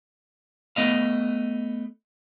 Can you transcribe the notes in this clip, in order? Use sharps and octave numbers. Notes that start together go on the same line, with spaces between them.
A3 B3 D#5 F5